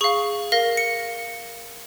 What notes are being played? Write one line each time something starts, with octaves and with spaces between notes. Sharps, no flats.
G#4 F5 C#6
A#4 F5 A#6
C#7